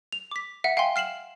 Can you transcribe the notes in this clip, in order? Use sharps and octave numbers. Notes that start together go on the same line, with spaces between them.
F7
D6 B6
E5 F#5
F5 G5 G#5 C6
F6 C7 E7 F#7